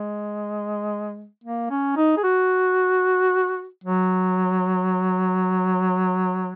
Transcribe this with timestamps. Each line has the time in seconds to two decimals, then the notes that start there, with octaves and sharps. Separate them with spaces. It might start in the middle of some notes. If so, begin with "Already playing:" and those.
Already playing: G#3
1.44 A#3
1.70 C#4
1.97 D#4
2.17 G#4
2.24 F#4
3.84 F#3